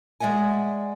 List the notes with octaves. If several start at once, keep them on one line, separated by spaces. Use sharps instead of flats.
G#3 D5 E5 F#5 G#5